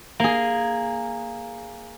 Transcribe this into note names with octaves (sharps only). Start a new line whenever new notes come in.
A#3 G#4